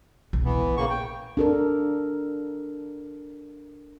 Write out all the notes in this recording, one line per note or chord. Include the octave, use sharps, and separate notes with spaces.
E1 C2
E3 B3
A#1
C#3 A#3 C#6
G5
D4 A4 A#4